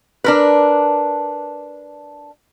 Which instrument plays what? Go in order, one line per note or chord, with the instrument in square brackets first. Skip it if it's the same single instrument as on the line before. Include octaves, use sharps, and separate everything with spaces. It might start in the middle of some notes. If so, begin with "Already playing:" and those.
[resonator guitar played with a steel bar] D4 A#4 B4